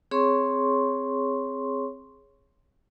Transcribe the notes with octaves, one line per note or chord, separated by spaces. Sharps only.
C4 G#4 C#5 C6 C#6